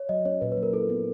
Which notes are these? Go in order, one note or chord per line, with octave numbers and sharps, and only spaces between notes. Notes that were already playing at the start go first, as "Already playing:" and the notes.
Already playing: C#5
F#3 D#5
C#4 C#5
A#2 B4
B4
F#3
A#4
E4 A4
B3